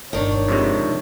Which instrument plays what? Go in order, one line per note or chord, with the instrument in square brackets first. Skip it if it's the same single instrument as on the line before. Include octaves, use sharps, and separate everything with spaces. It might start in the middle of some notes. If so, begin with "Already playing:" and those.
[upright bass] G1 B2 [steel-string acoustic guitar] D#3 D4 [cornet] C#5
[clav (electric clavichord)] F2 G#2 C3